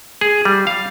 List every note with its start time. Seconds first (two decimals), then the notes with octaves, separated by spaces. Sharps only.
0.21 G#4
0.45 G3
0.67 F5